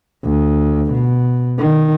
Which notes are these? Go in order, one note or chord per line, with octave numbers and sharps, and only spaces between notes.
D2
B2
D#3